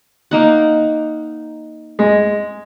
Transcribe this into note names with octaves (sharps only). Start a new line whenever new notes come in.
A#3 D#4 F#5
G#3